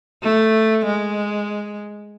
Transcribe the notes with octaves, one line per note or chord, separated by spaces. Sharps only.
A3
G#3